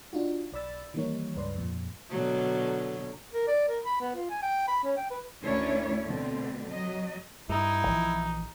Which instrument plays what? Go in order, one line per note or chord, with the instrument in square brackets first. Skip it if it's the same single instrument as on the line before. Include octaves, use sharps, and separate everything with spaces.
[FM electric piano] D4 D#4 F4 F#4
B1 D5 B5 E6 A6
D#3 E3 G3 A#3 D#4 C#5
C#2 G2 B4 D5 C6
F2 A#2
[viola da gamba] B2 D3 F#3
[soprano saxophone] A#4
D5
A#4
B5
B3
F4
G#5
G5
B5
C#4
G5
B4
[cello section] D2 D#3 C#4 D4 E4 C#5
B2 D3 A3 C4
F#3 D#5
[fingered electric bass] G2 [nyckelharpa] D#4 [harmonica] E4
[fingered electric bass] A#1 E3 F3